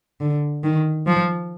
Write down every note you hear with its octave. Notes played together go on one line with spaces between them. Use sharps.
D3
D#3
F3